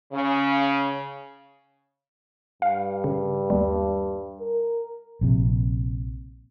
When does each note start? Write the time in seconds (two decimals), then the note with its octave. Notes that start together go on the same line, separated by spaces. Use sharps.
0.13 C#3
2.62 G2 F5
3.04 C#3
3.50 D#2 G3
4.40 A#4
5.21 A#1 C3